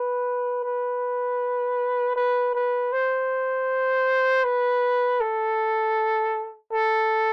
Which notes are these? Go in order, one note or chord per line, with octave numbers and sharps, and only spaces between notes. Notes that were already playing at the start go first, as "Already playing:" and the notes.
Already playing: B4
B4
B4
B4
C5
B4
A4
A4